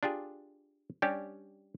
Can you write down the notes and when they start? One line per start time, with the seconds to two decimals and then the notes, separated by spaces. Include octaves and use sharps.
0.03 D4 F4 G4 G#4
1.02 G3 C#4 D4 G4